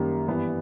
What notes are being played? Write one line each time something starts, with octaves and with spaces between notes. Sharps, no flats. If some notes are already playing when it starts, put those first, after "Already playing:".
Already playing: F#2 D#3 G3 A#3
G2 E3 G3 B3